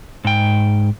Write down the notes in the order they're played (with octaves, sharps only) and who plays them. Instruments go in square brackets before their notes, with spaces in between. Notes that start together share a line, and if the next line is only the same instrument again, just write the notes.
[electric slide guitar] G#2 G5